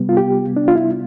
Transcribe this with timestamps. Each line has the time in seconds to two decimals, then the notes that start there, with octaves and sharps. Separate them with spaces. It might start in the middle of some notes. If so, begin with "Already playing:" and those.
Already playing: C3 G3 B3
0.09 F4
0.17 G4
0.57 D4
0.68 F4
0.76 E4